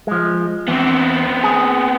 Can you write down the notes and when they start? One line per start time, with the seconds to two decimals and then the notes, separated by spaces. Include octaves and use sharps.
0.07 F3 G#3
0.68 E2 B3 C4
1.44 G#4